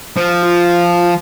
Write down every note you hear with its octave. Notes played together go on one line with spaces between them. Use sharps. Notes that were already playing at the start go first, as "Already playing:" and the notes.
F3
F4